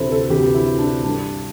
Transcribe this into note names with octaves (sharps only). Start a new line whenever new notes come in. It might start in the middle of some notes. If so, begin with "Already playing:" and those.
Already playing: D2 C3 E3 E4 A4 C5
A4
D2 C3 E3 G4
E4
D4
G2 D3 D4